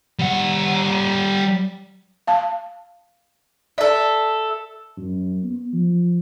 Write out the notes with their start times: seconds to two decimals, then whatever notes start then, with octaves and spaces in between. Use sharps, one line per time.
0.19 G3 F#5
2.27 F5 A5
3.78 A4 D5 E5
4.97 F#2
5.43 B3
5.73 F3